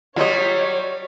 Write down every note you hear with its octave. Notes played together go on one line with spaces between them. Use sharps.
F#3 G3 F4 C#5 D#5